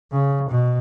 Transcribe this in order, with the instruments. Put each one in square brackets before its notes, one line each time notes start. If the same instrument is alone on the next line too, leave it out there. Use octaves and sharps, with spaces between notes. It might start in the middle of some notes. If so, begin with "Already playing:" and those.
[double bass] C#3
B2